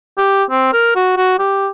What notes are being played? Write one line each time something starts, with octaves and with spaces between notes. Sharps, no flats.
G4
C4
A#4
F#4
F#4
G4